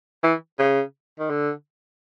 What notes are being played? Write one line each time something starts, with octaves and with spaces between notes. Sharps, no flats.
E3
C#3
D#3
D3